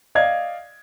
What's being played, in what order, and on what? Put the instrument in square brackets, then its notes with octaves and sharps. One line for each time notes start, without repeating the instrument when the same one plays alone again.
[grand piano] D5 D#5 F5 G#6